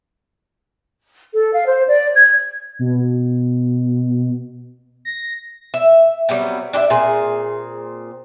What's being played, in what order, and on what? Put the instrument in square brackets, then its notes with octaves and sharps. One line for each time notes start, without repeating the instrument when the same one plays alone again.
[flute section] A4
F5
C5
D5
G#6
[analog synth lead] B2
A#6
[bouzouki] E5
F#3 G3 B3 C4
D4 G4 B4 E5
A#2 C4 G#4